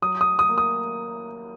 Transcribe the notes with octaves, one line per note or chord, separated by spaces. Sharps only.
F#3 D#6
D#6
D#6
A#3
D#6